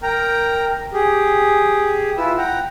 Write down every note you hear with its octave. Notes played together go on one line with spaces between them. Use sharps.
A#4 G5 A#5
G4 G#4
E4 F4 B4 E6
F#5 G5 A#5